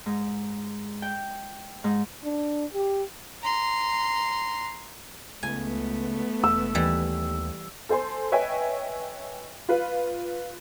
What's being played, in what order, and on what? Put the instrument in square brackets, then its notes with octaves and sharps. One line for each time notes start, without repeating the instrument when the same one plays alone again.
[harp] G#2
G5
G#2
[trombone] D4
G4
[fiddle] A#5 C6
[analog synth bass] C#2 [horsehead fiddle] A3 B3 [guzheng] G#5
[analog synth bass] E1 [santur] E6
[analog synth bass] D#2 [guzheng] E3 G3
[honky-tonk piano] A4 C5 G#5 C6
B4 C#5 D#5 E5 G5 G#5
F4 B4 F5